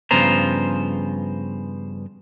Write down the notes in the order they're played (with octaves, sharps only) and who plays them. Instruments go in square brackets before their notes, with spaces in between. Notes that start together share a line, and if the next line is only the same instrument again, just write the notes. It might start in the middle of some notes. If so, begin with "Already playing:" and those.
[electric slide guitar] G2 C#3 F3 B3 C5 A#5